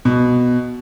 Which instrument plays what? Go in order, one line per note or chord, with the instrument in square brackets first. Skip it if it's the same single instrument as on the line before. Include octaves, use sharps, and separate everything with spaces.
[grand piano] B2